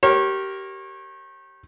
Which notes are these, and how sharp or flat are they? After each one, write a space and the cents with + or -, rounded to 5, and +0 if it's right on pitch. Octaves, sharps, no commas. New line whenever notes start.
G4 -20 A#4 +0 C#5 -35